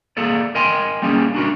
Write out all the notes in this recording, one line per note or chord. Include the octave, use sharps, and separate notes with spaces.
A#3 G#4 A4 D5
A#4 D#5 G5 G#5 C6
G3 A#3 C#4 G#4
D4 F#4 A#4